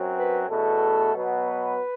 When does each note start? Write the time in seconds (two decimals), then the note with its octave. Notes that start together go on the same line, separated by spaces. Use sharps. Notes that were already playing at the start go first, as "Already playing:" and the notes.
Already playing: F#2 F#3 C4
0.17 B4
0.49 E2 B2 A3 A4
1.14 B2 F#3 B3
1.47 B4